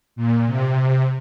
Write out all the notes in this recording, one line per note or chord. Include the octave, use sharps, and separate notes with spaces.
A#2
C3